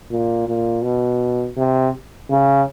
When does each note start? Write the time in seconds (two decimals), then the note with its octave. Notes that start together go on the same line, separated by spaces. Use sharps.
0.11 A#2
0.48 A#2
0.83 B2
1.57 C3
2.30 C#3